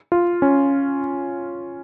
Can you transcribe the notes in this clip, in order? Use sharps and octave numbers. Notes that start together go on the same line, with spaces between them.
F4
C#4